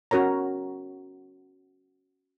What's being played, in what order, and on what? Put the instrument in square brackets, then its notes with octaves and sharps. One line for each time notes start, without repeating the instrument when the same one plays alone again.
[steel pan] C#4 F#4 A#4 C#5 A#5